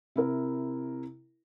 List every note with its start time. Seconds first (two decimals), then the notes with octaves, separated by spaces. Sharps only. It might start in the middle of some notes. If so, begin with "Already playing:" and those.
0.16 C3 E4 A#4